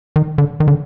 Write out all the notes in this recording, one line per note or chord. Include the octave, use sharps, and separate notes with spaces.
D#3
D3
D#3
D3